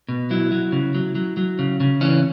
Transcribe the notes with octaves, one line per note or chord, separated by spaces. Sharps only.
B2
F#3 E4
F#3
C#3
F#3
F#3
F#3
C#3
C#3
E3 C#4